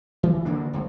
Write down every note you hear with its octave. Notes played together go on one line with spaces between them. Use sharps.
E3
D2 D3 A#3 D4
F#1 C#2